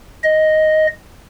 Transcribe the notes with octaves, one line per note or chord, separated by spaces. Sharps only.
D#5